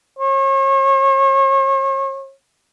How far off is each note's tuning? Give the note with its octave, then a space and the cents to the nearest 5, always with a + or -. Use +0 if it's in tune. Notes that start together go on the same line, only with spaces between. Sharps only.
C#5 -40